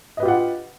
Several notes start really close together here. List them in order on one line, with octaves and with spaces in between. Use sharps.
D#5 B4 G4 F4 F#5